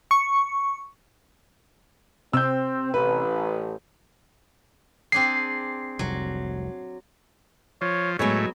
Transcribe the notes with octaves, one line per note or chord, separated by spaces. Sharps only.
C#6
C3 C4 E6 G6
A1 B4
C4 D4 G#4 C7
F1 C2 F#3
F3 C#5
A2 F#3 G#3 B3 C#5